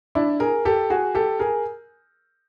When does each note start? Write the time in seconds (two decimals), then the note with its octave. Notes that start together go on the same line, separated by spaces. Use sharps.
0.15 D4 E4
0.40 G#4 A#4
0.65 G4 A4
0.90 F#4 G#4
1.15 G4 A4
1.40 G#4 A#4